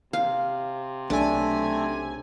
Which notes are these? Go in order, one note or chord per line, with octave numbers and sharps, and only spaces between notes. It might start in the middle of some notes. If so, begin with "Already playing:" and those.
C3 F5
B1 A3 D4 G#5